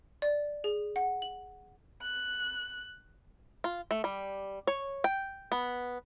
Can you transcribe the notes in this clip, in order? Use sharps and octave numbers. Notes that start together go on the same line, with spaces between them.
D5
G#4
F#5
F#7
F#6
F4
A3
G3
C#5
G5
B3